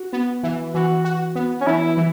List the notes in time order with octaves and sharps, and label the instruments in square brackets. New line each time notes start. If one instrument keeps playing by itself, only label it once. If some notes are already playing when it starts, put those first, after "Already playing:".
Already playing: [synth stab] F#4
B3
E3
[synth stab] E3 [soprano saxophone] F#4
[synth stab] F#4
B3
[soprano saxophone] C#4
[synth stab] E3 [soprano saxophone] E4
[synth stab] E3